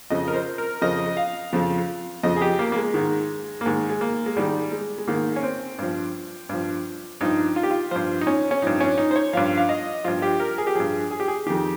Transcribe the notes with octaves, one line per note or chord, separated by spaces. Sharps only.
F2 C#3 F3 D#5
A#4
C5
A#4
F2 C#3 F3 D#5
F5
F2 C#3 F3
F2 C#3 F3 D#5
G#4
G4
A#3
A#3
G#3
G#2 D#3
A#3
G#2 D#3 G#3
G#3
A#3
G#3
G#2 D#3 G3
G#3
G#3
G#2 D#3 A#3
C#4
C4
G2 F3
G2 F3
G2 F3 D#4
F4
G4
F4
G2 F3 C5
D#4
C#4
C#4
G2 F3 D#4
C#4
D#4
C5
C#5
G2 F3 F5
F5
D#5
G2 F3 F4
G4
A#4
G#4
G4
G2 F3 G#4
G#4
G4
G#4
F2 D#3 G4